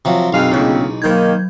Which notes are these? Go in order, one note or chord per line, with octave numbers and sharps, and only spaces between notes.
C3 F3 F#3 G5
B1 F#2 G#3 C4 F5
D2 A#2 C#3 E4 G#4 D#5
D#3 F#3 A#3 G6 G#6